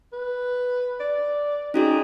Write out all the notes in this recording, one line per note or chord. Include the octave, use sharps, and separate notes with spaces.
B4
D5
C#4 D#4 F#4 G#4